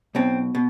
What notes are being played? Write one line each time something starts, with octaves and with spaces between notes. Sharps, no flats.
B1 B2 C4
B2